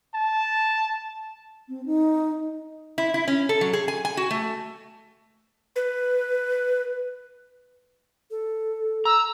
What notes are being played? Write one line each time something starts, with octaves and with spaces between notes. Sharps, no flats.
A5
C4
D#4
E4
E4
C#4
A4
F#3
G#4
G#5
G#5
F#4
A3
B4
A4
A#5 E6